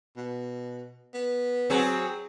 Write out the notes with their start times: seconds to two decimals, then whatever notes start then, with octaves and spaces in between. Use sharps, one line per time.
0.17 B2
1.14 B3
1.70 F#3 C4 G#4